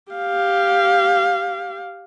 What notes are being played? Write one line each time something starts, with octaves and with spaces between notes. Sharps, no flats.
G4 F5